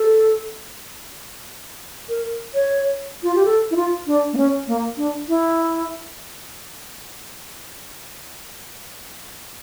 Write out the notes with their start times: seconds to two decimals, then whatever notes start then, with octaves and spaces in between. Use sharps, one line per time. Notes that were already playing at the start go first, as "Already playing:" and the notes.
Already playing: A4
2.09 A#4
2.55 C#5
3.23 F4
3.35 G4
3.45 A4
3.71 E4
3.76 F4
4.07 D4
4.33 A#3
4.37 C#4
4.67 A#3
4.97 D4
5.28 E4